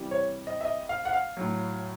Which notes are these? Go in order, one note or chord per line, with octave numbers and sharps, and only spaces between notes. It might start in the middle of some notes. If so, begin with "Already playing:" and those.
Already playing: C3 E3 G3
C#5
D#5
E5
D#5
F5
F#5
F5
A2 F#3